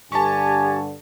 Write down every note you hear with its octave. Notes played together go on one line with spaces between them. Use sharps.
G2 D3 G4 G#5 A5 C#6